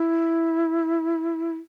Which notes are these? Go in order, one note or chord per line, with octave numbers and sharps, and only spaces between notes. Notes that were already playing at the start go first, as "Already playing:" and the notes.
Already playing: E4